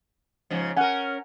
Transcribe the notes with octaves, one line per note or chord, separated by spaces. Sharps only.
G#2 C#3 F3
C#4 A#4 F#5 G#5